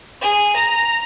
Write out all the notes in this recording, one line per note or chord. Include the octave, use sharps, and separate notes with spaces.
G#4
A#5